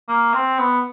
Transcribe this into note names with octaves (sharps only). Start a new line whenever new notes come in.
A#3
C4
B3